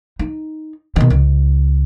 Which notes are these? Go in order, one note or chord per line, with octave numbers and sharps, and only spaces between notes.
D#4
B2 D#3
C#2